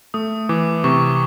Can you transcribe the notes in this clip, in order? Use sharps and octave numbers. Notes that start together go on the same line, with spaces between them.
A3 D#6
E3 D6
C3 C#6